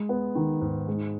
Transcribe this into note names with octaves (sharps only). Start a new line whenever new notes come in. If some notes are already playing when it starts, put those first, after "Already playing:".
Already playing: G#3
B3
D#3
G#2
G#3